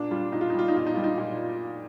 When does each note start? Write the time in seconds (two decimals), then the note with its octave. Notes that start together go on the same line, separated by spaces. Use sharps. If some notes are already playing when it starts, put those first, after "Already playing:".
Already playing: A#2 D4
0.11 G3 F4
0.32 A#2 D#4
0.41 F4
0.50 D#4
0.54 G3 F4
0.68 D#4
0.75 A#2 F4
0.86 D#4
0.95 G3 F4
1.04 D#4
1.18 A#2